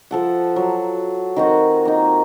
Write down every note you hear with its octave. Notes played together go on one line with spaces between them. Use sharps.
F3 A4 F#5
F#3
D#3 C4 F#4
A#3 D#4